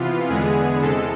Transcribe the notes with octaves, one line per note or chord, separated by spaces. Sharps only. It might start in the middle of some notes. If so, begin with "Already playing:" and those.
Already playing: C3 E3 B3 F4
E2 D3 G#3 B3 G#4
E2 C3 G#3 A4